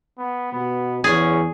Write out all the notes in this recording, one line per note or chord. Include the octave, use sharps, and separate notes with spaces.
B3
B2 B3
E2 C#4 G#4